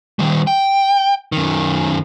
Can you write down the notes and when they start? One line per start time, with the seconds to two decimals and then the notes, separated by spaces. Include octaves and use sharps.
0.19 D#3 G3
0.47 G5
1.32 F#2 D#3